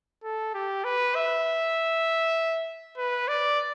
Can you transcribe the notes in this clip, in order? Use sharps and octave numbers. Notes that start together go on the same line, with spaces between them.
A4
G4
B4
E5
B4
D5